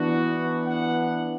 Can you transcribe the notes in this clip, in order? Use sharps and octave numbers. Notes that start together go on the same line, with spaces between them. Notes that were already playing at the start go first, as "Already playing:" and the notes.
Already playing: E3 B3 D4 F#4
F#5